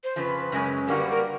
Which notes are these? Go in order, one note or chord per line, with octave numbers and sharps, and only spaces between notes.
C5
F2 C#3 F3 B4 C5
F#2 C#3 G#3 C#4
D3 G3 A#3 D#4 F#4 A#4
B4
A#4